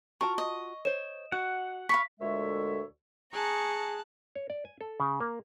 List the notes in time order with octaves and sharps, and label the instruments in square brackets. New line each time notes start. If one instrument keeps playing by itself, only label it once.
[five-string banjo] F4 F#4 A5 [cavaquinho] A#4 [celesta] C#6
[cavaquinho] D#5
[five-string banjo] C5 C#5 [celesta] E7
[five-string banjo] F#4 [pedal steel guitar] F#5
[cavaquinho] F5 B5 C#6 [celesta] B6
[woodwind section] D2 A#2 D3 G#3 C#5 E5
[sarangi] G#4 [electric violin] A5 F#6 [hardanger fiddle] A#5 C#6
[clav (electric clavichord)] C#5
D5
G#5
A4
C#3
A#3